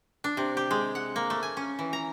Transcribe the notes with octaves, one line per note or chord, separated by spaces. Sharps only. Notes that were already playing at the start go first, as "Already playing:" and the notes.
D4
C3
G4
G#3
F#5
A#3
A3
G#5
C#4
E3
A#5